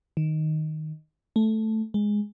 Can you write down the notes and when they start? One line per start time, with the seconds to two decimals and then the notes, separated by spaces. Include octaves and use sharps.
0.17 D#3
1.36 A3
1.94 G#3